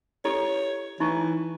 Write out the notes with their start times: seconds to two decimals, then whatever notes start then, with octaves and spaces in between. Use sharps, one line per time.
0.25 E4 G4 A4 C#5
1.00 E3 D#4 E4 C#6